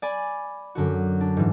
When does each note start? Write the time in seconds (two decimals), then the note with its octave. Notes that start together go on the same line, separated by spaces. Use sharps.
0.02 D5 G#5 B5
0.75 F#2 D3 F#4
1.21 D4
1.37 G#2 E3